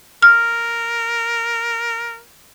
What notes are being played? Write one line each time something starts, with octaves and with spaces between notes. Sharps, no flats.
A#4 F6